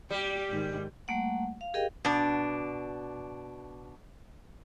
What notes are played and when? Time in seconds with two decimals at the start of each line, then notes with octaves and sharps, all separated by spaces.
0.10 G3 G4
0.50 G#2 D#3
1.08 G3 A3 A#3 F#5
1.61 F5
1.74 G4 G#4 A#4 D#5 F5 G5
2.05 B2 D4